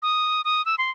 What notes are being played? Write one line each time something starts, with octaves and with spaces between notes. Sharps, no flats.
D#6
D#6
E6
C6